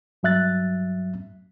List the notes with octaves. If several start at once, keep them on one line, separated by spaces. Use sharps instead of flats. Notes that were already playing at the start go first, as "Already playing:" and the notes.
G2 F#3 E5 F#6 A6